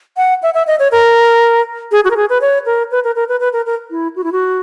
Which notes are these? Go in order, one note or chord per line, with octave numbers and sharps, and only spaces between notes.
F#5
E5
E5
D#5
C#5
A#4
G#4
F#4
A#4
G#4
B4
C#5
A#4
B4
A#4
A#4
B4
B4
A#4
A#4
E4
F#4
E4
F#4